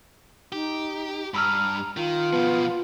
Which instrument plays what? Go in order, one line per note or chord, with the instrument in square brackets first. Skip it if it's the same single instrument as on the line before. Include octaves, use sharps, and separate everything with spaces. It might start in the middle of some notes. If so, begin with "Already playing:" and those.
[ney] D#4 [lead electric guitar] G4
[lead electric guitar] G2 [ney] A#5 [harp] B5 E6 F6
[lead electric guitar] D#3 [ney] F4
[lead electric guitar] B2 F3 [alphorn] B3